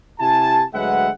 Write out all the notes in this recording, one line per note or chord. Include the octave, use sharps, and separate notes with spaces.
C3 E4 G4 G#5 A5
D2 F#3 G#3 B4 E5 F#5